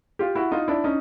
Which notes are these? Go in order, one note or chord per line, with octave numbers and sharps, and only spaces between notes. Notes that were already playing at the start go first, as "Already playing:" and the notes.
F4 G4
E4 F#4
D#4 F4
D4 E4
C#4 D#4